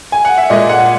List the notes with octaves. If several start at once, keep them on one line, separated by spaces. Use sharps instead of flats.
G#5
F#5
E5
A#2 G#3 D#5
F#5